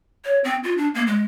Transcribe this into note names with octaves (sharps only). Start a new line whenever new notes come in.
C#5
C4
F4
D4
A#3
G#3